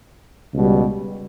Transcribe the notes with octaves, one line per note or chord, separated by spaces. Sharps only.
C#2 B2 G3